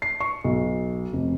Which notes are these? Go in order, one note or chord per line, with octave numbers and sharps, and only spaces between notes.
C7
C#6
B1
F1